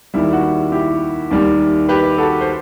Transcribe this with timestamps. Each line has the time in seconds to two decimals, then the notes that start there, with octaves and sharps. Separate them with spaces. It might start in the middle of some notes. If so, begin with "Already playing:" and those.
0.14 D#2 D#3 G3 E4
0.33 F#4
0.43 E4
0.72 E4 G4
1.31 D#2 D#3 G3
1.89 G4 B4
2.18 F#4 A4
2.41 C5